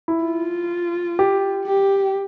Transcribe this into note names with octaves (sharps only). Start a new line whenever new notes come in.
E4
F4
G4
G4